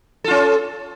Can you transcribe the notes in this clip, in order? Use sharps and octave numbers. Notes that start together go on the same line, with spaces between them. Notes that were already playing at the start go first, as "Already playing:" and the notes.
C#4 F4 A4